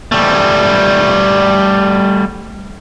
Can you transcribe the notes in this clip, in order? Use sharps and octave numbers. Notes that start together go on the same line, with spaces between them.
G3 A3